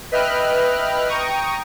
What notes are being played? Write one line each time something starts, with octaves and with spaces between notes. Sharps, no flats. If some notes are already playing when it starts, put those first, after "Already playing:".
B4 D#5 E5 G5 F6 F#6
G5 A#5 C#6 D#6